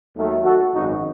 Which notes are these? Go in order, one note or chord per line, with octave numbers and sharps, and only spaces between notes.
D#2 D#3 F#3 A3
F#4 A4
G#1 F#2 D#3 F#3 D#4 F#4